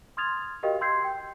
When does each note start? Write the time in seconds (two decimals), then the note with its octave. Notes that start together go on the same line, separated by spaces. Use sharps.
0.17 C6 D#6 F6 G#6 A6 F7
0.63 F#4 G4 A#4 D#5 F5 G5
0.81 C6 E6 G6 G#6 C7
1.04 G5